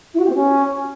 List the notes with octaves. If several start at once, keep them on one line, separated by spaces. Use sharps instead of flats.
E4
F#4
G4
C4
C#4